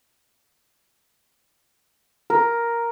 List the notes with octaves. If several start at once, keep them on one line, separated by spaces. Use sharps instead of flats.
A#4